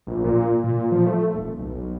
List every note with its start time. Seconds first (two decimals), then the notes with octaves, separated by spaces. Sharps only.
0.07 A#1
0.24 A#2
0.64 A#2
0.92 F3
1.06 A3
1.34 D#1
1.59 B1